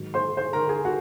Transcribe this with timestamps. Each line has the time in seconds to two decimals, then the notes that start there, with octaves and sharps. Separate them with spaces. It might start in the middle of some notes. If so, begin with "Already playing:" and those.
Already playing: G#2 D#3 F#3
0.14 C5 C6
0.37 C5 C6
0.53 A#4 A#5
0.69 G#4 G#5
0.85 F#4 F#5